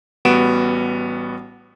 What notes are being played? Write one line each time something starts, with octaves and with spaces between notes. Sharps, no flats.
A1 G3 B3 F#4 D7 E7